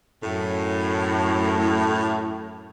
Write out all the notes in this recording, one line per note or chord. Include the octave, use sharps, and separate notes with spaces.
F#2 A2